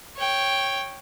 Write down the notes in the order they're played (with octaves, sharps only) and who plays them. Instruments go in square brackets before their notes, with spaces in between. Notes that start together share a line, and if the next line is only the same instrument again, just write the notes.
[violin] C#5 G5